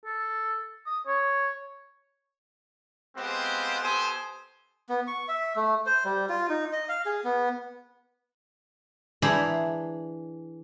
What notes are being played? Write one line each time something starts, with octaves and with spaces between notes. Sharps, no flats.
A4
D#6
C#5
G#3 B3 C4 F4 G4 C5
B3 G4 A4 C5 G#5 D#6
B3
C#6
E5
A3
C5
G3
F4
D#4
D#5
F5
G#4
B3
E3 D4 G#4 C5 A#5 B5